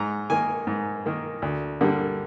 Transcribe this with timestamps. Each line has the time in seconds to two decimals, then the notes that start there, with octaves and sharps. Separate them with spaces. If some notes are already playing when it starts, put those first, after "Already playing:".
Already playing: G#2 A#5
0.30 D#3 A#3 G#5
0.67 G#2
1.06 D#3 A#3
1.42 D2
1.81 D3 G3 A#3